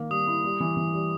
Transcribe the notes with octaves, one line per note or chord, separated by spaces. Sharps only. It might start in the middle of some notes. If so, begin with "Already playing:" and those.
Already playing: D#3 A#3
G3 D#6
E4
G3
E3
E3
G3